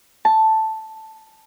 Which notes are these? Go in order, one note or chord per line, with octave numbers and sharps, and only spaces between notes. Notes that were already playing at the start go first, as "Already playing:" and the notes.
A5